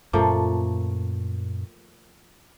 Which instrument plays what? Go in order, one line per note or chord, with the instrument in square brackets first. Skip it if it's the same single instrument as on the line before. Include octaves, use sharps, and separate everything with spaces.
[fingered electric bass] F#2 A#2 [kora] F3 A3 A#3